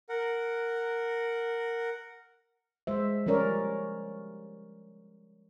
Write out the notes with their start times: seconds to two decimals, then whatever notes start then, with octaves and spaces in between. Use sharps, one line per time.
0.09 A#4 F#5
2.87 G#3 C5 E5
3.26 F3 G3 C#4 A#4 C#5 D5